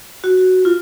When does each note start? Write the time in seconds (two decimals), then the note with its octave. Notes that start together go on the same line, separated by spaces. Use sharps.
0.24 F#4
0.65 F4